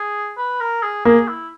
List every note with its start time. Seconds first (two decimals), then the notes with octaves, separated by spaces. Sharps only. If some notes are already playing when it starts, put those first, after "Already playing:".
Already playing: G#4
0.38 B4
0.61 A#4
0.83 G#4
1.05 A#3 G#4
1.28 E4